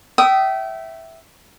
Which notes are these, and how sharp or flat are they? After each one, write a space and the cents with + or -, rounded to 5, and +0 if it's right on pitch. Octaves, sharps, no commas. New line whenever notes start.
E5 +0 G5 -30 D#6 +0